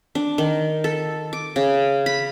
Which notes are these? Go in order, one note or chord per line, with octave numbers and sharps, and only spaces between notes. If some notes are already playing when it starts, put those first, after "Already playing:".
D4
D#3
A4
D6
C#3
B5